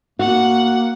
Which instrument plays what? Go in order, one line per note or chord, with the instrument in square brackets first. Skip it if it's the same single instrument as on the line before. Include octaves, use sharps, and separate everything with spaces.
[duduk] A#3 [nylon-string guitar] F#4 [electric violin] F#5